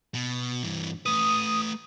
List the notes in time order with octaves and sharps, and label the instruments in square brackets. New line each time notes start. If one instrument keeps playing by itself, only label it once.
[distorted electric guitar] B2
G2 E3
[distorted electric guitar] A3 B4 [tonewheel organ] D#6